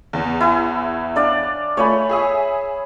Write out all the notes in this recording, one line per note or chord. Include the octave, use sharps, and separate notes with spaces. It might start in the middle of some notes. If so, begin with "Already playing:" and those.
E2
E4 G#5
D4 D5 F5
A3 F4 C#5 G#5 B5
G#4 E5 D#6